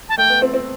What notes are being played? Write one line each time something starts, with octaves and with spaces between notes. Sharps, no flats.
A5
A3 G5
B3
C4
C4